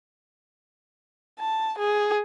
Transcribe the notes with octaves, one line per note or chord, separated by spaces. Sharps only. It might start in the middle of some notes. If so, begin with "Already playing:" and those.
A5
G#4